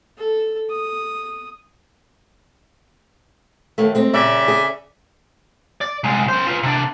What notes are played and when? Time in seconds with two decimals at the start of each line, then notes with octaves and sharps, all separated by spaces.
0.18 A4
0.71 D#6
3.78 D#2 D3 A3
3.95 G#3 C4
4.14 A#2 C#3 G3 D5 E5
4.48 G#4
5.81 D5
6.04 C2 G#3
6.28 C#4 C5
6.47 F4 B4
6.63 C3 D4